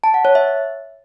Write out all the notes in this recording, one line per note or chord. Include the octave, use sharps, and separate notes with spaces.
A5
F#5
C#5
E5